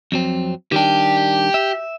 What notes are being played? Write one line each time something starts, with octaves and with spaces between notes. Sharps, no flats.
F2 F#3 C4
D#3 G3 D4 G4 G5
E5